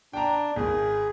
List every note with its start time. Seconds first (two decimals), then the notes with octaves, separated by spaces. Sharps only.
0.13 D4 G5 A#5
0.56 G#1 G#4